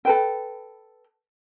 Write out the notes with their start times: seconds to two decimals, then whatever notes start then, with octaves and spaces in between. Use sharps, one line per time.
0.05 A4 B4 G5